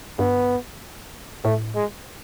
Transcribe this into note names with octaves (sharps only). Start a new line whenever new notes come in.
G2 B3
A2 A3
G#3